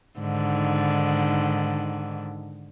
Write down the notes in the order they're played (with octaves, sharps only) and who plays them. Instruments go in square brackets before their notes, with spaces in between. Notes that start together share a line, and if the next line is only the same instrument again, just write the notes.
[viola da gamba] G#2 D3 D#3